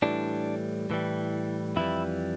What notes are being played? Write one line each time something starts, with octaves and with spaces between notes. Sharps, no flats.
A2 E3 G3 D4
A2 E3 G3
F2 E3 G3 E4